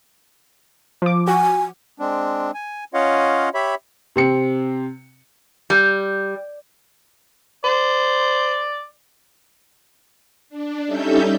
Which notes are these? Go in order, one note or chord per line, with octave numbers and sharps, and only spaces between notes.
F3 D6
F#4 G#5
G#3 C4 D4
G#5
C#4 F4 C#5 D#5 F5 F#5
G4 C#5 E5 B5
C3 C4 C#7
G3
C5 D5
D4
G3 C#4 D#4 A4 E5 G6